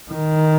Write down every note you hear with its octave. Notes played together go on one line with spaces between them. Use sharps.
D#3